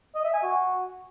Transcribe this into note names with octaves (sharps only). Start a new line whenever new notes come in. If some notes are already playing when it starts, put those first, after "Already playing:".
D#5
E5
G#5
F#4